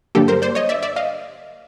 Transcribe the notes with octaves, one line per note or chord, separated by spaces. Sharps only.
G2 D3 F#3 A#3 G4 A4
A#4 C5
C5 D5
C#5 D#5
D5 E5
D5 E5
D#5 F5